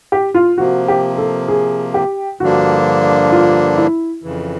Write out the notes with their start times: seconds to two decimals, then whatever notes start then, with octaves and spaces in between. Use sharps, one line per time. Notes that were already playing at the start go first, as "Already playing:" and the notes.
0.12 G4
0.34 F4
0.58 C3 F3 A#3 F#4
0.88 G4
1.18 A4
1.48 G#4
1.94 G4
2.40 G2 D3 F3 A#3 D4 F#4
3.32 F4
3.77 E4
4.23 F2 C#3 E3